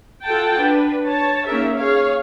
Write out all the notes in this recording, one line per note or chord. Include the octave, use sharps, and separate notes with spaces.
F4 A4 F#5 G5 A5
D4 B4
C#5 A5
A#3 C#4 D#4 G#4 A#4 E5
G#4 C#5 F5